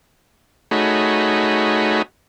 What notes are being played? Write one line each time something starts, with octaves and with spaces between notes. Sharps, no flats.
A3 D#4 F#4 G#4 C#5 B5